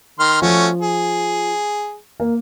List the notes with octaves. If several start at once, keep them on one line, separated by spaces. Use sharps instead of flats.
D#3 C6 F6
F3 A3 C#4 F#4
G#4
A#3